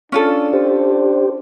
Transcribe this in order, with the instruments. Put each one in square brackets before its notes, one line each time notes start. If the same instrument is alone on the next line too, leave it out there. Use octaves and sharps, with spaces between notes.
[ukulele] C#4 F4 A4 [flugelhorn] D4
[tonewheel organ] G4 C5